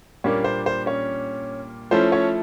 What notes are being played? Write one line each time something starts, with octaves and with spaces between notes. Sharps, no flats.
A#2 G3 A#3 C#4 D4 C#5
C5
C5
C#4 C#5
F3 A3 C#4 E4 C5
C#4 C#5